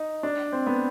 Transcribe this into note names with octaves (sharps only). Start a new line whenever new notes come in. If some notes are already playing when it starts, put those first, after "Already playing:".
Already playing: D#4
D4
C4
B3